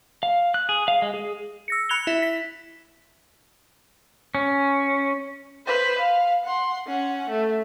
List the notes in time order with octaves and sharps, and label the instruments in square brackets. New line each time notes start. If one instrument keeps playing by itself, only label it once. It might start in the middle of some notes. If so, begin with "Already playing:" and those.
[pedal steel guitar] F5
F#6
G#4
F5
G#3
G#4
[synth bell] E6 A#6 C#7
B5 F#6 G#6 C#7 F7 G7
E4 E5
B6
[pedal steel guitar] C#4
[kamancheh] B4 C5
F5
F#5 C6
C#4 F#5
A3